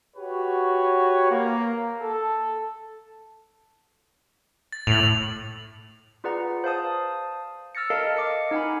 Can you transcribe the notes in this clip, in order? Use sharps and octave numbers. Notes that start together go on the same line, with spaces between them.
F#4 G4 B4 C#5
A#3
A4
A6
A2 F7 F#7
F4 G#4 B4 D5 F#5 A#5
C5 F5 A5 D#6
E6 F6 A6 A#6 C#7
A4 A#4 D#5 F5 A5
D#5 D6 C#7
D#4 A#4 F#5 G#5 B5